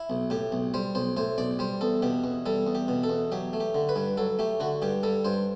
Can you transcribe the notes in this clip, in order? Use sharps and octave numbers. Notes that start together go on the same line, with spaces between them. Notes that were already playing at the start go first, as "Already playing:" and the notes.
Already playing: E4
B1
A2 G4
B1
G3 C5
B1 C5
A2 C5
B1 D5
G3 C5
E2 A4
B2 G4
E2
G3 A4
E2
G4
B2
A4
E2
F#3 G4
A3
G4
D3
B4
G2
F#3 A4
A3 G4
D3 F#4
G2 G4
G3 A4
G2 C5